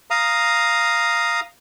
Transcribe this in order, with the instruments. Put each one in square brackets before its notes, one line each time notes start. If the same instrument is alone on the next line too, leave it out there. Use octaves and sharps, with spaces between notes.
[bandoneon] F5 A#5 D#6